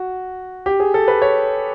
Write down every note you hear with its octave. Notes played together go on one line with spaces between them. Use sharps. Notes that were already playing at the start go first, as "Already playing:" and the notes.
Already playing: F#4
G4
G#4
A4
B4
C#5